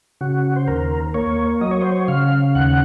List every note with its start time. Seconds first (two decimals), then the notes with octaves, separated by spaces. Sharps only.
0.21 C#3 F#4
0.56 C5
0.68 D#2 A#4
1.14 A#3 C#5
1.61 F#3 D#5
1.71 C#5
1.82 C5
1.92 C#5
2.08 C#3 F5
2.55 D#2 F#5